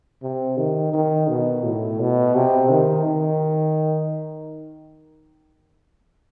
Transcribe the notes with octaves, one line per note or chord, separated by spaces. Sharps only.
C3
D#3
D#3
B2
A2
B2
C3
D#3
D#3